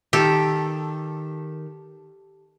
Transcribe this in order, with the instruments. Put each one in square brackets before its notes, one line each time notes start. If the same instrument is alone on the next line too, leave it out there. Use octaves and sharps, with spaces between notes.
[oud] D#3 [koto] G4 A4